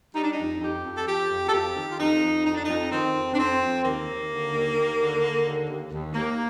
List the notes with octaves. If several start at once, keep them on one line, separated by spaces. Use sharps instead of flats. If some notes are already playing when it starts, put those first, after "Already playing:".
G3 D#4
D4
D#4
F2
F2 G4
F2
A4
F2 G4
F2
A4
F2 G4
D#3
F4
F2 D#4
F2
F2 D#4
D4
F2 D#4
D#3 C4
F2
D4
F2 C4
F2
D#2 A#3
D#2
D3
D#2
D#2
D3
D3
D#2
D#2
D#2
D#2 A#3